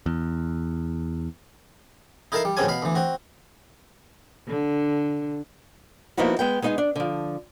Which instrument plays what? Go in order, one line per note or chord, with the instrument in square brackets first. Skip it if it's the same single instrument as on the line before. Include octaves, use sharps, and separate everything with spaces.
[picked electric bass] E2
[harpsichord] D#4 E4 A4 A#4 F5 A5
G3
A1 F#2 C#3 C4 C#4 G#5
B2 F5 B5
D2 E3
C4 F#4
[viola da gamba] D3
[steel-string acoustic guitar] F3 A#3 B3 D#4 E4 F#4
G#3 B3 G5
G#3 B3 D#4 F4 G#4
D4
D3 F3